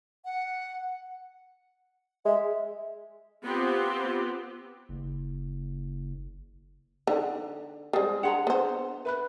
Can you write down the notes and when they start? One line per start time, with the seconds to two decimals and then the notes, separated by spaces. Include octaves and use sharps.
0.25 F#5
2.25 G#3 E5
3.44 B3 C4 F4 G4
4.89 F#1
7.07 D3 D#4 G5
7.93 G3 G#3 G#4 C5
8.23 D4 G#4 F#5 A#5 C6
8.47 B3 C5
9.05 B4 E5 B5 F#6